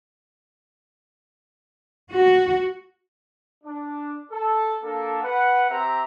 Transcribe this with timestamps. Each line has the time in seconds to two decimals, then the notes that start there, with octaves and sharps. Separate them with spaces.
2.13 F#4
3.64 D4
4.31 A4
4.82 A#3 D4 A4
5.22 B4 F#5
5.69 C4 G4 E5 A#5